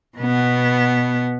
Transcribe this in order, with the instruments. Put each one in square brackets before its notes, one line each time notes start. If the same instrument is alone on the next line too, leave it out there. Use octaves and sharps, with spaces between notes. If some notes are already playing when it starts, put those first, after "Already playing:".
[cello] B2 B3